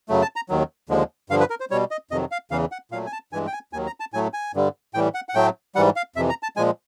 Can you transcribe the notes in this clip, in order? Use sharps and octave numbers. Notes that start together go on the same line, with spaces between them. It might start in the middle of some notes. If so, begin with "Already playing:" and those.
F#2 C#3 F#3 A3
A5
A#5
D#2 D#3 F#3
D#2 D3 F3 G#3
G2 D3 F3 F5
B4
A#4
C5
B2 G3 C#5
D#5
F2 C3 D#3 F#3 D#5
F5
E2 C#3 E3 F5
F#5
A#2 F#3 A3 F5
G#5
A5
G2 E3 G#3 G#5
G5
G#5
D#2 D#3 F#3 G#5
A#5
A5
A2 F#3 A3 G#5
G#5
G2 D3 G3
A2 E3 G3 G5
F#5
F#5
A2 F#3 A3 G5
G#2 E3 G3 F#5
F5
F2 C3 E3 E5
A#5
A5
A#2 F3 G#3 G#5